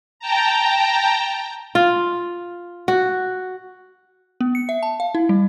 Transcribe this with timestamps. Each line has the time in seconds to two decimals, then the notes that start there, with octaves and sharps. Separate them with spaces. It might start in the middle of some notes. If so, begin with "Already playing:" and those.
0.20 G5 A5 A#5
1.75 F4
2.88 F#4
4.41 B3
4.55 C#7
4.69 E5
4.83 A5
5.00 F5
5.15 E4
5.29 G3